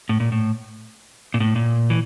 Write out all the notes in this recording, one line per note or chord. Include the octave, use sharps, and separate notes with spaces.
A2
A#2
A2
A#2
A2
A#2
E3